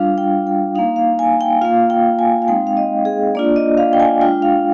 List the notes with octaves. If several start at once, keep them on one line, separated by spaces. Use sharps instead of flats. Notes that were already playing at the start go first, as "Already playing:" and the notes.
Already playing: G3 D4 F4 F5
G5
G5
A#3 D#4 F5
F5
G#5
G5
A#3 F4 F5
G5
G#5
F5
G#3 C4 D#4 G5
F5
D#5
G#4
A#3 D4 F4 D5
D#5
F5
G5
G#5
G#3 D4 F4 G5
F5